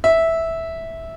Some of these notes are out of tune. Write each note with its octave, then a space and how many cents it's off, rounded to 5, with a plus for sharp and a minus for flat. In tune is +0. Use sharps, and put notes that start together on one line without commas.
E5 -10